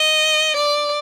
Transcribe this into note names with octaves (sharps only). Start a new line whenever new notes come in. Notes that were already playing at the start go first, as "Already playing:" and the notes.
Already playing: D#5
D5